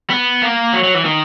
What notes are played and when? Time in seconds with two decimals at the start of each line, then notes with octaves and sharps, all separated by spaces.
0.10 B3
0.42 A#3
0.73 F#3
0.84 F#3
0.94 E3
1.05 D#3